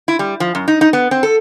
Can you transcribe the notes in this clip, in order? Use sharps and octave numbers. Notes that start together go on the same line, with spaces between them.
E4
G3
F3
F#2
D#4
D#4
B3
C4
A4